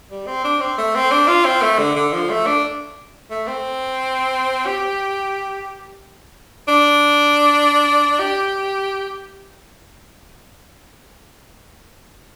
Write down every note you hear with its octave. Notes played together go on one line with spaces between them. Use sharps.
G3
C4
D4
C4
A3
C4
D4
F4
C4
A3
D3
D3
F3
A3
D4
A3
C4
G4
D4
G4